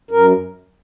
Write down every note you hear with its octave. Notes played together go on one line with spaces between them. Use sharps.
F#2 A#4